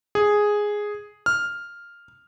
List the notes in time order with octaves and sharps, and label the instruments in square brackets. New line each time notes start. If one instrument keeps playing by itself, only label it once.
[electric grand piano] G#4
F6